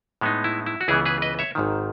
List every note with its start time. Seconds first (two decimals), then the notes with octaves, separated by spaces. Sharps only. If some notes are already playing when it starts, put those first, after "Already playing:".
0.21 A2 G#3 B3 D#4
0.44 E4
0.66 E4
0.81 F#4
0.88 C#2 C#3 E3 B3 E4 G#4
1.05 G#4 B4
1.22 B4 D#5
1.39 C#5 E5
1.55 G#1 G#2 D#3